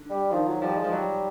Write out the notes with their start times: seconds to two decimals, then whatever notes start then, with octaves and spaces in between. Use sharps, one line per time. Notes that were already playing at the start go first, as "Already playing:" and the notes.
Already playing: D3
0.10 G3
0.31 D#3 F3
0.47 F#3
0.62 F3 G3
0.77 G#3
0.84 F3
0.92 F#3 G3